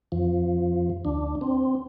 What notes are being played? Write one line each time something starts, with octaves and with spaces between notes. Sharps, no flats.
F2 F3
D2 D4
C4